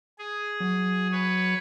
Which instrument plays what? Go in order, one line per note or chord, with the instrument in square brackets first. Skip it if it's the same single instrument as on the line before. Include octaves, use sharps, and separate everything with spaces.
[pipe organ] G#4
[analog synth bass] F#3
[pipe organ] B4 C#5